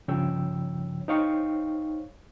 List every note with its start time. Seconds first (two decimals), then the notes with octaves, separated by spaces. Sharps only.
0.08 G2 C#3 F3 C#5 G5 E6
1.08 D#4 C5 C#5 F5 G5 C#6